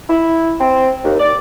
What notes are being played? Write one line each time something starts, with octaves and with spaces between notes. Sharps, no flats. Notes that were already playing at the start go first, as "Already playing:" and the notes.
E4
C4
D#2
D5